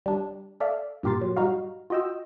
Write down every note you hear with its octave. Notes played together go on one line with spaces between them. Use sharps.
G3 D4
A4 D5 E5 F5
G2 A#2 G4 A#4 C6 A6
F#3
G3 D#4 F#4 F5
F4 F#4 D#5 G5 E6